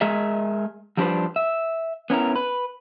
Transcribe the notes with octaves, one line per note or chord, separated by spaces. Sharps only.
G#3 G#4 A#4 D#5 E5
F3 G3 D4 A4 B4 C5
E5
B3 C#4 E4 A#4
B4